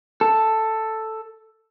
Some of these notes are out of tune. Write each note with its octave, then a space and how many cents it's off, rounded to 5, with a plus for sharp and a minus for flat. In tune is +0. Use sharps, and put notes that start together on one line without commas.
A4 +5